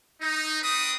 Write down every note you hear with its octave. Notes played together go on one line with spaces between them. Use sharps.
D#4
C4 B4 D#6